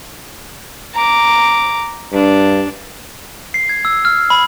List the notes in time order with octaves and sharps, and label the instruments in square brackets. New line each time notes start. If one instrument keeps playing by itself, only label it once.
[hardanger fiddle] A#5 D6
[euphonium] G2 [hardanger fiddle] D4
[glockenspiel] C7
G#6
E6
F6
B5